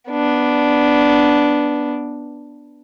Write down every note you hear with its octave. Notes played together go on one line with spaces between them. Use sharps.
B3 D4